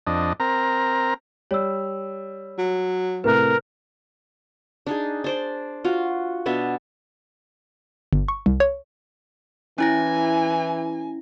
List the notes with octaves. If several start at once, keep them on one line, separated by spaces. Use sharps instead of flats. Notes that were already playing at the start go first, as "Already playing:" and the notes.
F2 D4 D#5
C4 A#4 A#5
G3 C#5 E6
F#3
A2 C3 A3 A#4 B4 F#6
D4 D#4 G#4
D4 C5 D5
F4 F#4 F5
B2 B3 D4 E5
G1
C#6
C2
C#5
E3 C#4 E4 G#5 A#6